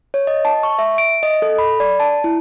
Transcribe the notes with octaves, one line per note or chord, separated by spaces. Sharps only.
C#5
D#5
A5
C#6
E5
D7
D#5
A4
B5
D5
A5
E4